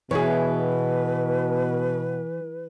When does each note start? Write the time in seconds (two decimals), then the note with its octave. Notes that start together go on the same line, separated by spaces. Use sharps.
0.11 B2 E3 G#4 B4 C#5